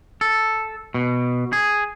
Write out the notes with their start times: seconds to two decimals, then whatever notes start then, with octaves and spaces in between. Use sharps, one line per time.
0.21 A4
0.94 B2
1.53 G#4